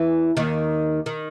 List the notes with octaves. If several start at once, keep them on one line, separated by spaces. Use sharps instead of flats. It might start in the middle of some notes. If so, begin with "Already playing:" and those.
Already playing: E2 E3
D#2 D#3
D#3